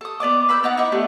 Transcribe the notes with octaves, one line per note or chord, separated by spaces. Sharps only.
A4 D#6
B3 D5 D#5 D6
B4 B5 E6 G6
B3 D#4 F#5 D6
D#4 E4 B4
A3 B3 D4 G4